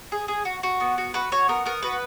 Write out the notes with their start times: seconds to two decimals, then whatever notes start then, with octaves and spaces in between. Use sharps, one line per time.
0.12 G#4
0.28 G#4
0.45 F#4
0.63 F#4
0.80 B3
0.98 F#4
1.14 F#4 B4
1.32 F#4 C#5
1.48 B3 A#4
1.65 B3 A#4
1.83 F#4 B4